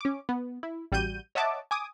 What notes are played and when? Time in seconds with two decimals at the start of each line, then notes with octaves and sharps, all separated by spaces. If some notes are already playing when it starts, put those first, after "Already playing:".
0.01 C#4 D6
0.29 B3
0.63 E4
0.92 A1 G3 F#4 G6 D#7
1.35 C#5 D#5 E5 F#5 A5 D6
1.71 G#5 D6 D#6